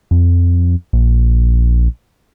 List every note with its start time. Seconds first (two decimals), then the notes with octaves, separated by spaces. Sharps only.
0.11 F2
0.93 A#1